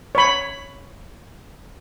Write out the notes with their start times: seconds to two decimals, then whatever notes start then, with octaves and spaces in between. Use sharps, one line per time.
0.15 C#5 B5